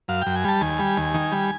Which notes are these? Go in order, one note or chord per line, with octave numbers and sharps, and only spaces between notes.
F#2 F5
F#2 G5
G#5
G3 A5
D#2 G#5
G3
D#2
D#3
G3